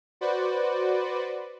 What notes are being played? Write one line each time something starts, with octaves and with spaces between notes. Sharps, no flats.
F#4 B4 C5 D5